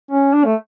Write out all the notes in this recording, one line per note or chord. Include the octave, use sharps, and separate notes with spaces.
C#4
D4
A3